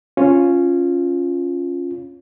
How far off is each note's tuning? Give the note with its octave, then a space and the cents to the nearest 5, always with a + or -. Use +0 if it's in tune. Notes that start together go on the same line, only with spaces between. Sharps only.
C#4 +0 F4 +0